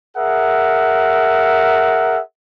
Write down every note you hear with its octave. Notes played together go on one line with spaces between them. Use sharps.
G#4 A#4 E5 F#5